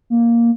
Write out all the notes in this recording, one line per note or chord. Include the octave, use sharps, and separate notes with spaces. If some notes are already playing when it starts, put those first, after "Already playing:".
A#3